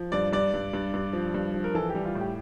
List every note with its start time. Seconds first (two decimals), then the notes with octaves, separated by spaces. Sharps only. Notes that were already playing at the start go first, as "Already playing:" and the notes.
Already playing: F3
0.12 G2 D5
0.32 G2 D5
0.54 G2
0.73 G2
0.94 G2
1.13 F3
1.34 G2
1.54 F3
1.64 A#4
1.74 E3 A4
1.89 G4
1.95 G3
2.05 F4
2.15 A2
2.21 G4